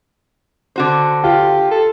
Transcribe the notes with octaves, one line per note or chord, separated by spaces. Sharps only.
D3 F#4 C5
F4 G4
A4